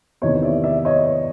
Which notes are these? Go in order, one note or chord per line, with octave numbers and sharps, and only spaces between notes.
E2 C3 D#3 C#5 D#5
D5 E5
D5 E5
C#5 D#5